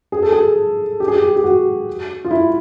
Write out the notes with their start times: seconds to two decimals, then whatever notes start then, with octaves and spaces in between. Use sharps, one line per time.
0.12 G#4
0.23 A4
0.32 G#4
1.00 G4
1.08 G#4
1.16 G4
1.36 G4
1.44 F#4
2.25 F4
2.31 E4